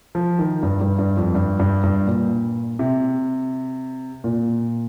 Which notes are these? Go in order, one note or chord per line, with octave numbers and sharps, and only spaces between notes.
F3
D#3
G2
G2
G2
F2
G2
G2
G2
A#2
C3
A#2